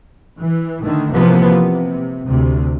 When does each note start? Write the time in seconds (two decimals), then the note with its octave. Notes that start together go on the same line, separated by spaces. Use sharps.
0.39 E3
0.82 D3 D#3 A3
1.13 C3 E3 F3 A#3 B3
1.59 C3
2.27 D2 C3